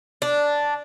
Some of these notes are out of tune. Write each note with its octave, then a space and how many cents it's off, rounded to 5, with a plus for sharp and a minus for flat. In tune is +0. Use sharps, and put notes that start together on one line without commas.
D4 -5